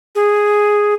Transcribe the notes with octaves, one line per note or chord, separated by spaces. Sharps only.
G#4